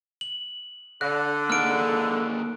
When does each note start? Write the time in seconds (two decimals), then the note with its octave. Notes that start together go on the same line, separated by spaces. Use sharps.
0.21 F#7
1.01 D3 F#6
1.50 A#3 D#4 G#4 F6 D7